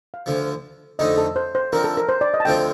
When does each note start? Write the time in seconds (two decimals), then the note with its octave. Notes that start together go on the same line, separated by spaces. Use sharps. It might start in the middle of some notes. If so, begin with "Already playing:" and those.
0.14 F5
0.26 D2 D3 F3
0.99 F2 D3 A3 D#4 D#5
1.18 A4
1.36 C5
1.55 C5
1.73 D3 F3 C4 A#4
1.84 A4
1.97 A#4
2.09 C5
2.21 D5
2.34 D#5
2.40 A5
2.45 D2 D3 F3 C4 F4 G5